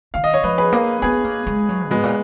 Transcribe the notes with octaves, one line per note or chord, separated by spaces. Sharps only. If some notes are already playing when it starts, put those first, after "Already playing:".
D#3 F5
D#5
C#5
F3 B4 D#5
G#4 B4
A#3
B3 G#4 B4
A#3
G#3
F#3
G#2 G#3 B3
A#2